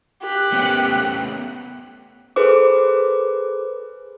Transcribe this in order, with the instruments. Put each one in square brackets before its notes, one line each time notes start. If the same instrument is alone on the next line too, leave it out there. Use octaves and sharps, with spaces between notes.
[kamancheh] G4 F#6
[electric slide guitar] A3 B3 C#4
[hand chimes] G#4 A4 B4 C5 D6